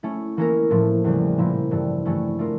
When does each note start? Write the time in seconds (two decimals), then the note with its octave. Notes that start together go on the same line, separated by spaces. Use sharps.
0.03 A3 C#4 E4
0.37 E3 A#3 C#4 E4 A#4
0.70 A2 F3 A3
1.04 E2 C#3 G3
1.38 A#2 F3 A#3 E4
1.71 G2 E3 A3
2.05 G2 E3 A3 C#4 E4
2.39 A3 D4 F4 A#4